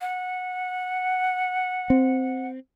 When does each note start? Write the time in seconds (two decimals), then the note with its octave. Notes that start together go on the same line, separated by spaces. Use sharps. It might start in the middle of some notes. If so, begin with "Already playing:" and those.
0.01 F#5
1.90 C4